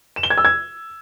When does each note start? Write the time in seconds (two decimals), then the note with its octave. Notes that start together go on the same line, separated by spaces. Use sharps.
0.16 E7
0.23 G7
0.30 G#6
0.38 E6
0.45 G#6